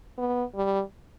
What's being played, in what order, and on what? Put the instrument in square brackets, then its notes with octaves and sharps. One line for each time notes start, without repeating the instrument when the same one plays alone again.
[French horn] B3
G3